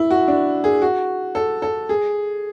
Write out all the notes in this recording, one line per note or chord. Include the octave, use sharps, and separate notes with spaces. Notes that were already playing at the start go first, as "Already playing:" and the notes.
Already playing: E4
F#4
D4
G#4
F#4
A4
A4
G#4